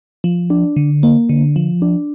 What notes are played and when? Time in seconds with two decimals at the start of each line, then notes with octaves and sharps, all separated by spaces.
0.24 F3
0.50 D4
0.77 D3
1.03 A#3
1.29 D3
1.56 F3
1.82 D4